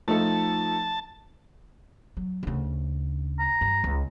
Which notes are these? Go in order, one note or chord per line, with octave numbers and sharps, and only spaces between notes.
F3 A3 D#4 A4 A5
F#3
D2 C#3
A#5
G2
C#2